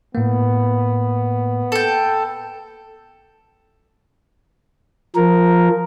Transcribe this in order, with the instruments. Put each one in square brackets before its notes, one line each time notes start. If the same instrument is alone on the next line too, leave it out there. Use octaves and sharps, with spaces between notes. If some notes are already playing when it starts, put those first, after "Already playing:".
[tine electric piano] A2 A#3 [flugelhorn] B3
[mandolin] A4 G5
[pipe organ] F3 A#4